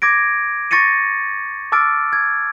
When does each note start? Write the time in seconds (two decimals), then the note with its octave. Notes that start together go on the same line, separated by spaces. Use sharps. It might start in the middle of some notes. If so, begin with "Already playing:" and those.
0.02 D6 G#6 A#6 D7
0.71 C#6 A6 A#6 C#7 D#7
1.72 A5 D6 E6 F6 A6 D7
2.13 G#6